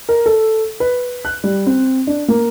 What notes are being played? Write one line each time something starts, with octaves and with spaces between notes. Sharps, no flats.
A#4
A4
B4
F#6
G3
C4
D4
A#3